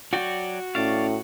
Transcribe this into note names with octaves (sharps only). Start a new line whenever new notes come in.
F#3 F#4 D5 G5
A2 C#4 D5 F5